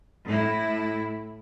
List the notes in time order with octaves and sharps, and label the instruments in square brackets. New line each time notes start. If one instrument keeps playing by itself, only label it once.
[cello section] A2 E4